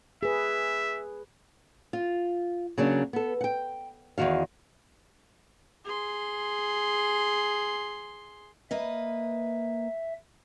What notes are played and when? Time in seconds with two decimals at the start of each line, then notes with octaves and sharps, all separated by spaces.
0.23 G#4 B4 E5
1.93 F4
2.78 C#3 F#3 A#3 D4
3.13 B3 A4
3.41 F#5 G5
4.18 E2 G2 D#3 F#4 F5
5.85 G#4 C6
8.71 A#3 B4 D#5 E5